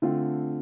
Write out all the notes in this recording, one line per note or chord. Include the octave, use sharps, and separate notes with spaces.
D3 A3 C4 F4